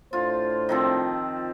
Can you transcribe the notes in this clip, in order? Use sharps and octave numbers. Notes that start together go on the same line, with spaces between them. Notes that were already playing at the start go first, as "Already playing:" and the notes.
A2 D4 F4 C5
D#3 F3 C4